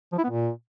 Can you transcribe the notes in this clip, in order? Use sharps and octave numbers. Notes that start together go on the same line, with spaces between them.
F3
E4
B3
A#2